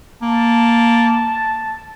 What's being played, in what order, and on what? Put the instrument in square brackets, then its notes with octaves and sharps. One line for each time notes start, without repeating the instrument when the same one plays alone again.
[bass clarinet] A#3 [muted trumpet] A5